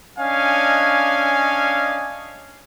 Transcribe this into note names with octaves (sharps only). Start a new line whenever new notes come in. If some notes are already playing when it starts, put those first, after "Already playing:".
C#4 D4 D#5 F5 G#5